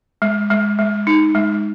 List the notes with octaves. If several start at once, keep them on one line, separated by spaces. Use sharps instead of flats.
G#3
G#3
G#3
D#4
G#3